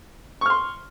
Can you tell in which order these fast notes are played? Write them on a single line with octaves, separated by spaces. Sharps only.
C#6 F6 C6